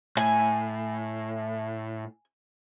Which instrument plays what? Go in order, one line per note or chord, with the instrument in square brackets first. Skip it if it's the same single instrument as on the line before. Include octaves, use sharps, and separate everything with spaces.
[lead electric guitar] A2 [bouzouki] G#5